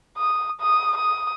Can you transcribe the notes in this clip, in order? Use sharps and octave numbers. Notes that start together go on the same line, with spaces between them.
D#6
D#6
D#6